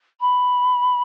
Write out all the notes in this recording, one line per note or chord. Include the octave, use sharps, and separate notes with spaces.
B5